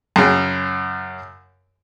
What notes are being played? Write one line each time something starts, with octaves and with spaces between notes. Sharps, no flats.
F#2 C#3